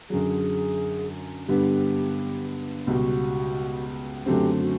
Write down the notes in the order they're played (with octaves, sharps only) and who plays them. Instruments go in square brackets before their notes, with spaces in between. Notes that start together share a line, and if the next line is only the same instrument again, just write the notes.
[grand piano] F#2 D3 F#3 [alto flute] G#4
[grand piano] G2 D3 G3 B3 [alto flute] G4
[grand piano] C#2 B2 G3 [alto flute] F#4
[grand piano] F#2 D3 F#3 A3 C4 [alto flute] G4
[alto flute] F#4